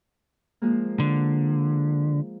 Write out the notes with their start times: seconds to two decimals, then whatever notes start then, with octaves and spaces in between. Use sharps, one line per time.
0.62 F3 G#3 A#3
1.00 D3